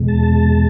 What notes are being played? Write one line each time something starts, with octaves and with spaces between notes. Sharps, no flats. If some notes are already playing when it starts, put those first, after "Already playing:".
Already playing: E2 B2 G#3
A5